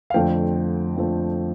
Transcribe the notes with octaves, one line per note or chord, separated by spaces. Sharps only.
F5
F2 D3 F3 A3 C4 G5
F2 D3 F3 A3 C4